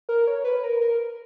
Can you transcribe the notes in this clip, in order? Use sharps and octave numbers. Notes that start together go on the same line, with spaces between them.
A#4
C#5
B4
A#4
A#4